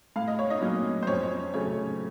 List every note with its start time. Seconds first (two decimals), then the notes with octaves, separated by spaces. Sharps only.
0.16 A2 F5
0.27 D#5
0.39 C#5
0.50 D#4 D#5
0.61 F#3 A#3 C#4
1.03 C5
1.07 F2 C#4 C#5
1.54 C#3 F#3 A3 C#4 C#5